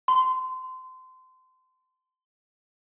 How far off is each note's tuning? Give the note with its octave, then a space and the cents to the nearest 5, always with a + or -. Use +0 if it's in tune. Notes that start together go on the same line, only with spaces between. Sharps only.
C6 -25